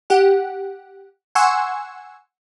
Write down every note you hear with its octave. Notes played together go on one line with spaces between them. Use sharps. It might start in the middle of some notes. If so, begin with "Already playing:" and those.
G4 F#5
F#5 G#5 C6 C#6 E6